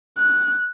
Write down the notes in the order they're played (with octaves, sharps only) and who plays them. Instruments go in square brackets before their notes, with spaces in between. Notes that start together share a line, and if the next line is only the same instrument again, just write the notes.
[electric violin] F#6